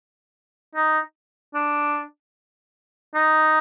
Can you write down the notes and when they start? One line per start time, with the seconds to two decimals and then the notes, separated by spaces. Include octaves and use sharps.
0.75 D#4
1.55 D4
3.15 D#4